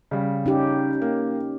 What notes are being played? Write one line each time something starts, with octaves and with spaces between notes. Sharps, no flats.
C#3 G3
C#4 D#4 G4
A#3